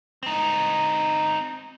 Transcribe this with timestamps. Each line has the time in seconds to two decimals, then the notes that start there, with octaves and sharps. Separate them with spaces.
0.23 C4 D#4